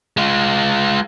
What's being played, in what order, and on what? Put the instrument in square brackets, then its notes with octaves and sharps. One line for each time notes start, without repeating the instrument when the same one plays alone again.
[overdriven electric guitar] G#3 F4